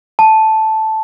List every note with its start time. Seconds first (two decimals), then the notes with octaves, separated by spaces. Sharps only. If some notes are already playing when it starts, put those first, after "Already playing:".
0.19 A5